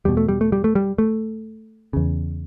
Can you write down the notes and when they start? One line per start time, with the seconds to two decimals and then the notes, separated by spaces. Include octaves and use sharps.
0.05 E2 B2 G3
0.17 A3
0.28 G3
0.41 A3
0.52 G3
0.64 A3
0.75 G3
0.98 A3
1.93 E2 C#3